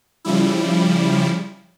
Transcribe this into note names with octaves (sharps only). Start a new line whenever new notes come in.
C#3 F3 G3 E4